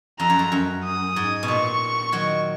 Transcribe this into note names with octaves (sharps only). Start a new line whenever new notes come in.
F2 A#5
F#2
F2
F#2
D#6
G#2
B2
A#2 C#6
D#3 F#3